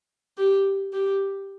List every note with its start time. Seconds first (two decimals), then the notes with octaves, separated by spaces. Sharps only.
0.38 G4
0.93 G4